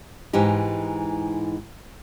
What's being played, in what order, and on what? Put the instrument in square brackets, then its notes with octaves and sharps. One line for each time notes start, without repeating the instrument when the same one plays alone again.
[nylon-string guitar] G#2 E3 D#4 G4